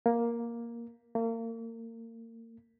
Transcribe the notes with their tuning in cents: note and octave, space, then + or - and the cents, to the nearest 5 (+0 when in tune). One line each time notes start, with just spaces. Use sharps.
A#3 +5
A#3 -35